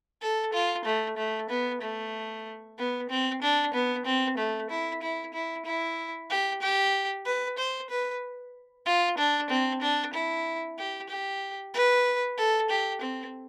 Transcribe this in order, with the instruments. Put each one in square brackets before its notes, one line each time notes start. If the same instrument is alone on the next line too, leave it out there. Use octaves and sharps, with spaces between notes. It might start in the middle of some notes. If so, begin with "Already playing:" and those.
[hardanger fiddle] A4
F4
A3
A3
B3
A3
B3
C4
D4
B3
C4
A3
E4
E4
E4
E4
G4
G4
B4
C5
B4
F4
D4
C4
D4
E4
G4
G4
B4
A4
G4
C4